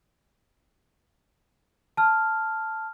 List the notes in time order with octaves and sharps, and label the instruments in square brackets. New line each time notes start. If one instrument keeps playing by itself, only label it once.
[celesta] A5 F6